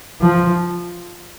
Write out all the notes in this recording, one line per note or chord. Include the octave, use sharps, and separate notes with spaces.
F3